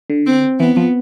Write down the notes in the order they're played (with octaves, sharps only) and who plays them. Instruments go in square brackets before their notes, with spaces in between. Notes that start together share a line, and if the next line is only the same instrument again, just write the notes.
[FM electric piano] D3
[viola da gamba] C4
[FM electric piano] E3 [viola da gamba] B3
[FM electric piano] F3